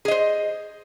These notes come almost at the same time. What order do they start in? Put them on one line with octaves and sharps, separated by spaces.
G#4 D#5 C5